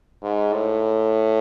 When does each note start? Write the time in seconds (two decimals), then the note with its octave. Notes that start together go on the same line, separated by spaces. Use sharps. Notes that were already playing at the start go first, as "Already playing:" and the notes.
0.22 G#2
0.53 A2